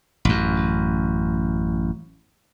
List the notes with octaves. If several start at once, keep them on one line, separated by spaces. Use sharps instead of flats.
A1 F#2